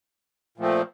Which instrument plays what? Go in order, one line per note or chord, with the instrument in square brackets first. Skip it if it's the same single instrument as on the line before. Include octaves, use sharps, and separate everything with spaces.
[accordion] A#2 F3 A3 C4